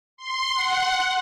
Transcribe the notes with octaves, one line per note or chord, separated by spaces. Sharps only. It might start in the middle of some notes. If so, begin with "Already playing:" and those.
C6
F#5